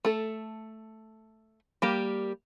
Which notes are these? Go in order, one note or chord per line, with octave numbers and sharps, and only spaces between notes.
A3 A4
G3 A#3 G4